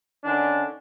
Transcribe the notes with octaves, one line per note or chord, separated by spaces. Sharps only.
D3 D#3 C#4 D4